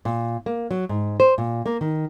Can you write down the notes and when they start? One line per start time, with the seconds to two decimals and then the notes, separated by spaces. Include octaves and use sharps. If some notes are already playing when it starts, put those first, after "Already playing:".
0.05 A#2
0.46 A#3
0.71 F#3
0.89 G#2
1.20 C5
1.38 A#2
1.66 A#3
1.81 D#3